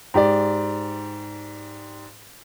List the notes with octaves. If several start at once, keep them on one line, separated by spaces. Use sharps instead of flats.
G#2 G4 D5